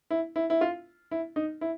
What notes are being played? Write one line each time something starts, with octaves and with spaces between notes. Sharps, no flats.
E4
E4
E4
F4
E4
D#4
E4